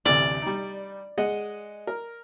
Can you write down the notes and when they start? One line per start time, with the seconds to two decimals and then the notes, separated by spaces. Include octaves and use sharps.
0.05 A1 D2 C3 D5
0.42 G3 D#4
1.18 G#3 D#5 F#5
1.87 A#4